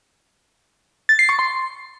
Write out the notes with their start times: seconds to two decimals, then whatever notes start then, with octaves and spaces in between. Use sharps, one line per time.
1.09 A6
1.19 C7
1.29 C#6
1.39 C6